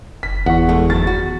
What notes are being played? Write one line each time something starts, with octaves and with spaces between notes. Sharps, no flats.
F#1 B6
E2 F#5 C#6
G#3 A3
D#3 F#3 E4 A6
F#4